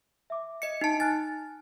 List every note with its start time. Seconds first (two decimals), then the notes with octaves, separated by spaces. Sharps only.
0.30 E5 D6
0.62 D#5 C#7
0.81 D#4 A5 C#7
1.00 G#5 F6 F#6 A6